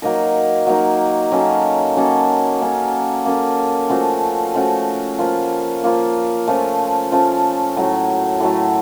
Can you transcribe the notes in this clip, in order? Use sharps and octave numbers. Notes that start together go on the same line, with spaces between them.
F#3 A#3 D#4 A#4
F#3 A#3 D#4 A#4
F#3 A#3 C#4 A4
F#3 A#3 C#4 A4
A#3 C#4 A4
A#3 C#4 A4
F3 A3 C#4 F#4
F3 A3 C#4 F#4
F3 A#3 F4
F3 A#3 F4
F3 A3 C#4
F3 A3 C#4
A2 F#3 A3
A2 F#3 A3